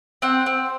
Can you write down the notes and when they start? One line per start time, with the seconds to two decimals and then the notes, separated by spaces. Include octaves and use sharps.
0.22 C4 F#5
0.46 C4